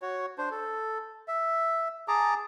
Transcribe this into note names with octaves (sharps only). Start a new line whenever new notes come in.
F#4 C#5
D4 C5
A4
E5
G#4 A5 A#5 D6